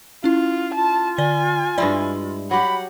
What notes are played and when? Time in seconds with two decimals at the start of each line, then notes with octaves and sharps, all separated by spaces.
0.24 C#4 E4 F4
0.74 F4 A5
1.18 D3 D5 G#5 G7
1.78 G2 G#3 E4 D5 E5 C6
2.51 F#3 G4 F#5 B5